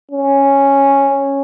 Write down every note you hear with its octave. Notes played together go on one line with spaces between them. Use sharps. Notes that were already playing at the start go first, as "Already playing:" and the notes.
C#4